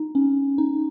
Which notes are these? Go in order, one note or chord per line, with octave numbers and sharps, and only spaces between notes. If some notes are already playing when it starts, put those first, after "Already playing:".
Already playing: D#4
C#4
D#4